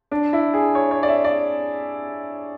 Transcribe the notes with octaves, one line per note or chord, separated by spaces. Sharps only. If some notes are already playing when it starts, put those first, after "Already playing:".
D4
E4
G#4
C#5
C#5
D5
E5
D5